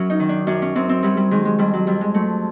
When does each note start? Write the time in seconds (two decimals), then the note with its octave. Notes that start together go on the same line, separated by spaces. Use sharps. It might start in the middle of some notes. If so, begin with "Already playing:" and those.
Already playing: F#2 F#3 C#4
0.10 D#4
0.20 D#3
0.29 D4
0.47 F#2 D4
0.62 C#4
0.75 F#2 C4
0.89 C4
1.03 F#3 G3
1.17 G3
1.31 D#3 G#3
1.45 G#3
1.58 F2 G3
1.74 F#3
1.87 F2 G3
2.01 G#3
2.14 F#3 A3